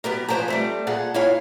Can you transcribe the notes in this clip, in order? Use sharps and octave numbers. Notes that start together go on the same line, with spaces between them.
F#3 B3 G4 A#4
F3 B4 C5 G5 G#5 A#5
G3 A3 C4
A#2 G#4 A4 F#5
A#3 E4 F4 C#5 F5 G#5